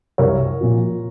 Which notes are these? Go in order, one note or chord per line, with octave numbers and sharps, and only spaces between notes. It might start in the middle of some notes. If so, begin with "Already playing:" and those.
C2 A#4 C#5
A#2 F3